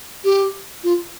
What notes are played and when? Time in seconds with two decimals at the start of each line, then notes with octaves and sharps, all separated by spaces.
0.24 G4
0.84 F4